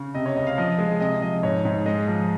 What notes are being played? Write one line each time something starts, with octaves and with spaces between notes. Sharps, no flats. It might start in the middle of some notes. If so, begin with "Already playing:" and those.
Already playing: C#3
C3 D#5
C#5
C#2 D#5
F5
F3 D#5
G#3
C3 D#5
F3 D#5
G#2 C#5
G#2
G#3 D#5
F3